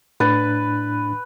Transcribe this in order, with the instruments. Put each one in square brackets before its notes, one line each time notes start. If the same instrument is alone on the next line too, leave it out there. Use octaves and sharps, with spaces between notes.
[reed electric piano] A2 D4 A6 [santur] B4